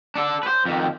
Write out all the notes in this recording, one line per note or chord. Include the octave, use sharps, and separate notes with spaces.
D4 A4
B4 C5
F2 D#3